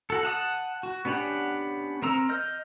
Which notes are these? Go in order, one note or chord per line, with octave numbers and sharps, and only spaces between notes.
F#4 A4
F#5 A5 D#6
F#4
B3 C#4 D4 G4 F#5
C4 A#4 A#5 E6
D#5 F6 G6